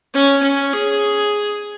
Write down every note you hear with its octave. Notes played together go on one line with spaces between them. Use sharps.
C#4
C#4
G#4